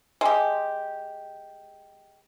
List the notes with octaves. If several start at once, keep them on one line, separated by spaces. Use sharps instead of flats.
G#3 G4